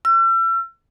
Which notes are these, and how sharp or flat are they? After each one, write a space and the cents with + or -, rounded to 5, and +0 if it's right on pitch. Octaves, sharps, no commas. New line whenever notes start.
E6 +40